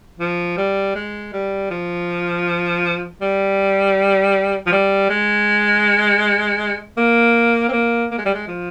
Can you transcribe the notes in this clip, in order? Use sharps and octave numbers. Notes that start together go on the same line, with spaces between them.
F3
G3
G#3
G3
F3
G3
F3
G3
G#3
A#3
C4
A#3
A#3
G#3
G3
G#3
F3